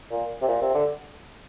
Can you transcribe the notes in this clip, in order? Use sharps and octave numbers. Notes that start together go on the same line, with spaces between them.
A#2
C3
A#2
C3
D3